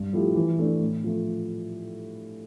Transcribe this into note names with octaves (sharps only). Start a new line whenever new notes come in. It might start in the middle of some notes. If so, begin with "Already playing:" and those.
Already playing: G2
F3 A3 E4 G4
E3
A3 D4
A2
F3 A3